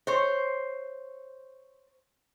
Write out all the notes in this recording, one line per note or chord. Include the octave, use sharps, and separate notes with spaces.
C5 C#5